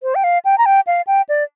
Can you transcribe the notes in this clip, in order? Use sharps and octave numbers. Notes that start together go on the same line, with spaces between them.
C5
G5
F5
G5
A#5
G5
F5
G5
D5